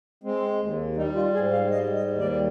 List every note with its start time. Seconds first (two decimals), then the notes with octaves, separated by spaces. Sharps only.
0.24 G#3 C4
0.60 D#2
0.96 G3 D#4
1.15 F4
1.34 G#2 G#4
1.53 F5
1.71 G3 D#5
1.96 D#5
2.08 D#2
2.20 D5